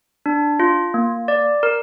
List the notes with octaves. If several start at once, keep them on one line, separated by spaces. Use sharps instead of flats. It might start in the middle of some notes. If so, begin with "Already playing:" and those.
D4
F4
A#3
D5
A#4